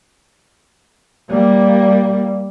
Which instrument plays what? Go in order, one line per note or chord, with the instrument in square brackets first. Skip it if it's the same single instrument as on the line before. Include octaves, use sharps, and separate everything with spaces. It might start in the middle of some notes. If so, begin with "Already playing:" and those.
[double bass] G3 A#3